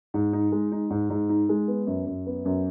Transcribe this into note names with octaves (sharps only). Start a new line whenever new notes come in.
G#2
D#4
G#3
D#4
G#2
G#2
D#4
G#3
B3
F#2
F#2
B3
F#2